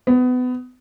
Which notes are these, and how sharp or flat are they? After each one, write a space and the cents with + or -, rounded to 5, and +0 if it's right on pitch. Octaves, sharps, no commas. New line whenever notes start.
B3 +25